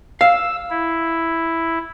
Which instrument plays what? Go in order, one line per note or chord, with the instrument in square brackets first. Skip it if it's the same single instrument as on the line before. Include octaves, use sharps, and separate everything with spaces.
[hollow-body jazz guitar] F5 [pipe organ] E6
[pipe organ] E4